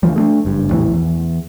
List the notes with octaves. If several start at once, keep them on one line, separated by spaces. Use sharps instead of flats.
D2 E3 F3 G3
G#3 A3 D4
F#1 G2
A#1 E2 A2 E3
E2